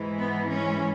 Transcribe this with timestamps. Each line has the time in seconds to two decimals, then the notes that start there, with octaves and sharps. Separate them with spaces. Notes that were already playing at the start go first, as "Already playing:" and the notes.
Already playing: G#2 E3 G#3
0.18 B3
0.52 C#4